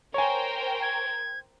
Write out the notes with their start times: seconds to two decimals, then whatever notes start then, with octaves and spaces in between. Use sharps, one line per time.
0.14 A#4 C5 C#5 G5 G#5
0.82 G#6